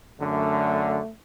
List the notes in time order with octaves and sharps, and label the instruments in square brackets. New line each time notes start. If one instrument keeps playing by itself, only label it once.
[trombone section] F#2 D3 [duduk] A3